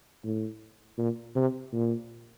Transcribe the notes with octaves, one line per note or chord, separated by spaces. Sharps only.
A2
A#2
C3
A#2